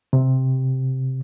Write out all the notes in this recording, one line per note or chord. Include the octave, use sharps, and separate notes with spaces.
C3